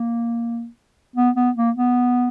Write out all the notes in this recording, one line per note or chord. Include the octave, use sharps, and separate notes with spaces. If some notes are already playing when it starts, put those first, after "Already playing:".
Already playing: A#3
B3
B3
A#3
B3